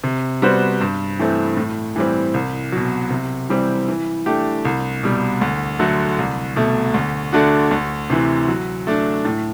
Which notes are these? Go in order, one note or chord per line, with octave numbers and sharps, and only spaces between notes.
C3
G3 B3 F#4 C5
G2
E3 A3 C4
A2
E3 G3 C4
C2
B2 F#3
C3
E3 G3 C4
E3
A3 D4 G4
C2
B2 G3
D2
D3 F#3 A3
C2
B2 A3
D2
D3 A3 D4 F#4
D2
C3 E3
F#3
A3 D4
A2